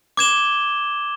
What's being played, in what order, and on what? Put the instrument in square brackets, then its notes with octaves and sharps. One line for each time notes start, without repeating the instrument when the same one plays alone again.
[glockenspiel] D6 G#6 E7 G7